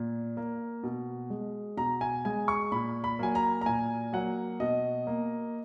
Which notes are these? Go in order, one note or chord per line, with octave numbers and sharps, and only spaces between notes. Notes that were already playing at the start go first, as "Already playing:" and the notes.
Already playing: A#2
A#3
B2
G#3
B2 A#5
G#5
G#3 G#5
C#6
A#2 B5
B5
F#3 A#3 G#5
A#5
A#5
A#2 G#5
F#3 A#3 F#5
B2 D#5
A#3